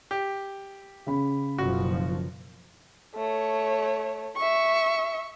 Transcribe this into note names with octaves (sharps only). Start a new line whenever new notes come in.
G4
C#3 B5
F#1 B2 F3 F#4
A3 C#5
E5 C#6